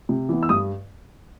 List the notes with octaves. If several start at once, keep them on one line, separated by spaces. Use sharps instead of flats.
C3
E3 B3
E6
G2 D#6